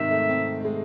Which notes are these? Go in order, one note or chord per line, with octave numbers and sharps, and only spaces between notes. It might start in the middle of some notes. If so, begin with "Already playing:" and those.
Already playing: G#2 C3 D#3 E5
A3
C4
A3
G#3